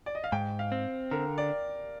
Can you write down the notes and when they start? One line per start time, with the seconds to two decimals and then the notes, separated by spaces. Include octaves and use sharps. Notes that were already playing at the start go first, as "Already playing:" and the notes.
0.06 D5
0.15 D#5
0.24 F5
0.32 G#2 G5
0.59 F5
0.72 C4
1.11 D3 A#4
1.38 D5